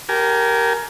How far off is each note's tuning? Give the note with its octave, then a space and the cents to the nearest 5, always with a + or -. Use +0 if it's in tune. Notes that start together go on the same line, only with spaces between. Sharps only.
G4 -20 A#4 +0 G#5 +25